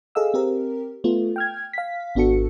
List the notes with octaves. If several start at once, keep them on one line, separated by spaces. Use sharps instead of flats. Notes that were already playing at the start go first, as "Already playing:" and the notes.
G#4 A4 D#5 F5 E6
C4 G4 A#4
A3 B3 F4
G5 F6 G#6
F5 B6
G#1 B3 D4 F#4 A4 C#7